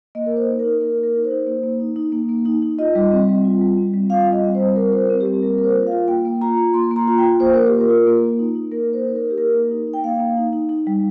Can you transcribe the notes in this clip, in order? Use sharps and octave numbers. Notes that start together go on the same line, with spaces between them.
A#3 D#5
A#4
A#3
C5
D#4
A#4
D#4
A#3 A#4
A#3
A#4
D#4
C5
D#4
A#3
A#3
D#4
D#4
A#3
A#3
D#4
D#4
F4 D#5
G3
C4
G3
F4
G3
C4
G3
F4 F5
G3
D#5
C4
C5
G3
F4 A#4
G3 C5
A#4
C4
G4
G3
A#3 A#4
A#3 A#4
C5
F4
F5
F4
A#3 G5
A#3
F4 A#5
F4
A#3 C6
A#3
A#5
F4
G5
F4
A#3 C5
A#3 A#4
G4
F4
A#4
F4
A#3
A#3
D#4
D#4
A#3 A#4
A#3
C5
D#4
A#4
D#4
G4
A#3 A#4
A#3
D#4
D#4
G5
A#3 F5
A#3
D#4
D#4
D#4
G3